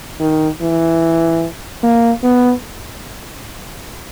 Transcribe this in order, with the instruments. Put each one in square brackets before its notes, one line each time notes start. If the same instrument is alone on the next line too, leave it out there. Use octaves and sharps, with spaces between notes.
[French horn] D#3
E3
A#3
B3